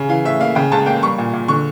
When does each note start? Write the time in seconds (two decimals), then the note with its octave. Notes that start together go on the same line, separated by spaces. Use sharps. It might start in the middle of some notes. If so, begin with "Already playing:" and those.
Already playing: C#3
0.09 E3 F5
0.25 A2 E5
0.40 A#3 F5
0.55 C#3 G5
0.72 C#2 A5
0.86 A#3 G5
1.03 G3 C#6
1.18 A#2
1.33 A#2
1.48 D3 C#6